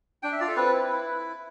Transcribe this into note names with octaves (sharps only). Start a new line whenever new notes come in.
D4 G5
E5
F4 D5
A4
C4 B4
E4
E4